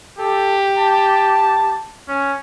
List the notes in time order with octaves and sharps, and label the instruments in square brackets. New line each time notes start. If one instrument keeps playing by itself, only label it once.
[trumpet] G4 [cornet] A4
[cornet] A5
[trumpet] C#4